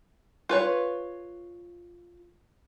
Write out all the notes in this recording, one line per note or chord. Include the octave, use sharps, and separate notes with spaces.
F4 B4 C#5